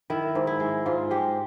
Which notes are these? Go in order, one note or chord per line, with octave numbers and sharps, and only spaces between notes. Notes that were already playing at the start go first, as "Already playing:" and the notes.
D#3 E4
G#2
E4
G#3
G#2 F4
G#3 G4